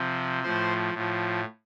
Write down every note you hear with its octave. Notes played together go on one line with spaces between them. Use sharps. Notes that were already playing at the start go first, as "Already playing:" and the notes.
Already playing: C3 F3
A2 F3 C5
A2 F3